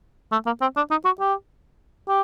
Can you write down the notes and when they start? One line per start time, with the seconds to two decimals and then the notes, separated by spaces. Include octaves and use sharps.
0.32 A3
0.46 A#3
0.61 C4
0.77 D4
0.91 D#4
1.05 F#4
1.20 G4
2.08 G4